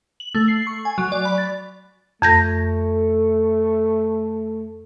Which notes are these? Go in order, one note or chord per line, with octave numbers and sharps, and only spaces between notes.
F#7
A3
C7
C#6
G#5
F#3
D5
B5
A6
F2 A3 G6 A#6